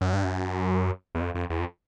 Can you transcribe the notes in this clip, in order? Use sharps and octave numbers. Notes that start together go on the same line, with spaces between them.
F#2
G2
F#2
E2
F2
F2
E2
F2